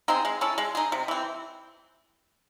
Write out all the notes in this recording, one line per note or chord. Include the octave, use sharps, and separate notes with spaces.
C4 D#4 G#4
G#3
C#4 E4 A4
G#3
D#4 G#4
C3
E3 C4